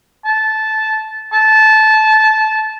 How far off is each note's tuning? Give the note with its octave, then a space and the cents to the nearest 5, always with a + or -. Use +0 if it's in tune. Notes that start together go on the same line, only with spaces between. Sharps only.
A5 -15
A5 -20